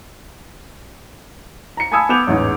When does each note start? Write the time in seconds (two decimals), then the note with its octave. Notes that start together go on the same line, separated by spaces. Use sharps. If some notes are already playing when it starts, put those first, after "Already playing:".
1.77 A#5 C#7
1.92 G#5 A5 B5 D#6 E6 G#6
2.09 B3 B5 D6 G6 F7
2.27 A1 E2 G#2